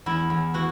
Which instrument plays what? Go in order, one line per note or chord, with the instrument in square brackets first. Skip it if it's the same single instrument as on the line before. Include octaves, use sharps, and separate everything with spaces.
[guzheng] E2 E4
E2
E3 F#4